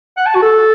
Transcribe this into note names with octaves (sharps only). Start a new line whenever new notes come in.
F#5
A5
F#4
A4